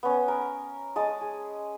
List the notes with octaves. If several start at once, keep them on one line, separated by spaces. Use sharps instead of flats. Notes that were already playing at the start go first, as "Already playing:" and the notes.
B3 C#4
A#4
G#3 A5 D#6
G#4